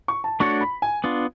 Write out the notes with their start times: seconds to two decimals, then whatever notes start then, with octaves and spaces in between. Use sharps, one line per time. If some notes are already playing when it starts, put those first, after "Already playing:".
0.08 C#6
0.24 A5
0.40 A3 D4 F#4 A4 C#5 C#6
0.61 B5
0.82 G#5
1.04 B3 D4 F4